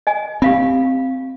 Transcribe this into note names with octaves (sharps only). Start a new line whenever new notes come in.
D#5 G#5
C4 G4 F5 B5